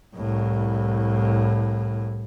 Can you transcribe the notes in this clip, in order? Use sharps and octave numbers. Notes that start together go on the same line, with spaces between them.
C2 A2